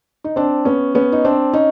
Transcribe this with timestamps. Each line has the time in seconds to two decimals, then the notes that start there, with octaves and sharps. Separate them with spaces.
0.24 D#4
0.36 C4 D4
0.65 B3 C#4
0.95 B3 C#4
1.12 D#4
1.25 C4 D4
1.53 C#4 D#4